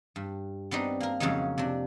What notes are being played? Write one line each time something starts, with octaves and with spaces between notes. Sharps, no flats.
G2
B3 C4 D4 D#4
A#3 A#4
F2 C#3 F#3 G#3 C#4 D#4
C3 D4